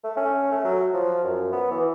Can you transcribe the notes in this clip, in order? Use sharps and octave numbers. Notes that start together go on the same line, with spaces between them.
A3
C#4
A3
F#3
F3
F#2
B3
E3